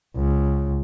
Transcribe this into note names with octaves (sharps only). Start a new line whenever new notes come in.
C#2